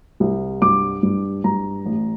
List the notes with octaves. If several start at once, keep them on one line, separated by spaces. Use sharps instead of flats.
C2
G2 D6
G2
G2 A#5
A1